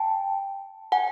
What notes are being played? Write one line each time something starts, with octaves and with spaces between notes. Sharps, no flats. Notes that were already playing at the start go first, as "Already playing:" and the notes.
Already playing: G5 A5
F#5 G#5